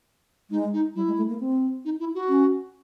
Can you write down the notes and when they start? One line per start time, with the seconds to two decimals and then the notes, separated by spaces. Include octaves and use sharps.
0.50 G#3 D#4
0.73 D#4
0.95 G3 E4
1.07 G#3
1.18 A3
1.29 A#3
1.40 C4
1.85 D#4
2.00 E4
2.15 F#4
2.29 C#4